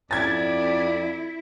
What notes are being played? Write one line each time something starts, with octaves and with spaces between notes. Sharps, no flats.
F2 E4 D5 G#6 A6